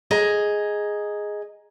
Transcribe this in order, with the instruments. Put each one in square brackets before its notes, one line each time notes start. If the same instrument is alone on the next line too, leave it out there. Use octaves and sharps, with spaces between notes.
[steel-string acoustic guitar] G#4 D#5 A#5